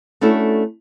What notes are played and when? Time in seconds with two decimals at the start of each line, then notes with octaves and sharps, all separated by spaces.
0.21 A3 C#4 D4 E4 F#4 A4